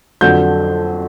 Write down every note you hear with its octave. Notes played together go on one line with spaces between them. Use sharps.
F2 D3 F#3 G6